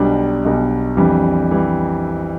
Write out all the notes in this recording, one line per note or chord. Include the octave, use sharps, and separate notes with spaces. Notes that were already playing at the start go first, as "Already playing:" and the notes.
Already playing: B1 B2 G3 D4
B1 B2 G3 D4
F2 E3 G3 D4
E3 G3